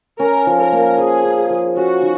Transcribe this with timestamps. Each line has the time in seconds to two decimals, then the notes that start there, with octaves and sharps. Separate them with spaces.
0.20 C#4 A#4
0.47 F3
0.59 A#4
0.72 A#3
0.98 F3 G#4
1.24 C#4
1.50 F3
1.76 C#4 F#4
2.02 D#3